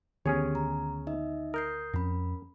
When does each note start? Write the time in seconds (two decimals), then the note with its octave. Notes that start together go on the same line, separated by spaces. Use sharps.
0.26 D2 D#3 B3 C#4 G4 G#4 C#5 G#5
0.55 A#5
1.07 D#4 D#5 E5
1.54 A#4 D#6 G6 C7
1.94 F2 C#4 B5